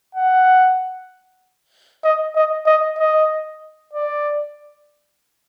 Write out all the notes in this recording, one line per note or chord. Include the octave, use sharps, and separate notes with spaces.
F#5
D#5
D#5
D#5
D#5
D5